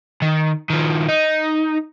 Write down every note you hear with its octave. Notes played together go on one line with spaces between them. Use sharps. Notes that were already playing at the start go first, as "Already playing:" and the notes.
D#3
D#3 F3
D#4